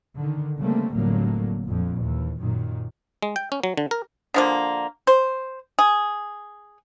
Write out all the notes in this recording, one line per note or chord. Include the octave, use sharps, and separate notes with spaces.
D3 D#3
C#3 G3 A3 A#3 C4
F1 A2 D3 F#3 G3 A#3
A#1 F2
D#2 E3
F#2 A#2 D#3
G#3
G5
C#4
F#3
D3
A#4
D3 F3 A#3
C5
G#4